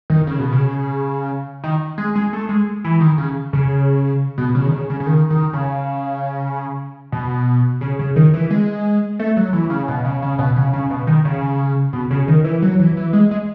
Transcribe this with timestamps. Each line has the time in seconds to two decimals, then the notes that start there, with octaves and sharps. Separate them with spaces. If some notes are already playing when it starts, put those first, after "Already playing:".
0.10 D#3
0.27 C#3
0.39 B2
0.53 C#3
1.64 D#3
1.98 G#3
2.15 G#3
2.33 A3
2.49 G#3
2.84 E3
3.00 D#3
3.18 C#3
3.53 C#3
4.38 B2
4.55 C#3
4.66 D#3
4.72 C#3
4.90 C#3
5.00 C#3
5.06 D#3
5.30 D#3
5.53 C#3
7.12 B2
7.81 C#3
7.99 C#3
8.16 D#3
8.34 E3
8.51 G#3
9.19 A3
9.37 F#3
9.53 E3
9.70 C#3
9.88 B2
10.05 C#3
10.22 C#3
10.39 B2
10.56 C#3
10.73 C#3
10.90 B2
11.07 D#3
11.25 C#3
11.93 B2
12.11 C#3
12.28 D#3
12.44 E3
12.62 F#3
12.79 E3
12.97 E3
13.13 G#3
13.31 G#3